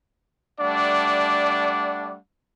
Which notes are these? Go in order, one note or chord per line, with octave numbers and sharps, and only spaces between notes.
G3 A3 D4 D5 F#5